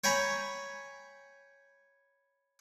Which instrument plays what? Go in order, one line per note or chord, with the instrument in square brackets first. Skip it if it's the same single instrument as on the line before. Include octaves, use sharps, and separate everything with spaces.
[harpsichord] C#5 G5 G#5 A#5 B5